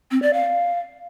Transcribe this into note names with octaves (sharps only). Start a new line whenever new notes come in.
C4
D5
F5